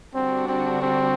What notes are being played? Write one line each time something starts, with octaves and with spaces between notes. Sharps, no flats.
D3 G3 C4 D4 F#4
C4
C4